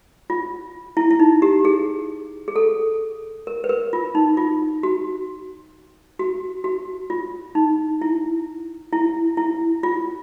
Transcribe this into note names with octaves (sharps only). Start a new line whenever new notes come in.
F4
E4
E4
D#4
G4
G#4
G#4
A4
A#4
B4
A#4
F4
D#4
F4
F#4
F#4
F#4
F4
D#4
E4
E4
E4
F4